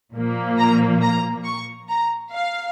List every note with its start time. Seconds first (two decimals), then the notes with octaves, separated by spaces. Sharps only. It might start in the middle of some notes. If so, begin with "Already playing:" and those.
0.14 A#2 F3 A#3
0.58 A#5
1.01 A#5
1.45 C#6
1.89 A#5
2.32 F5